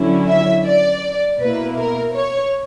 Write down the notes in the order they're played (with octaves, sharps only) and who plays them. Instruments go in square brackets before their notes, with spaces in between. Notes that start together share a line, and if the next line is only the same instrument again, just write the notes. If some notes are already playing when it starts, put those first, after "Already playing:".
Already playing: [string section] D3 F#3 C#4 E4
E5
D5
B2 A#3 E4 B4
A#4
C#5